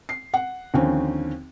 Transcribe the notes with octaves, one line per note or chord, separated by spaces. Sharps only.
C7
F#5
D#2 D3 F3 C4 C#4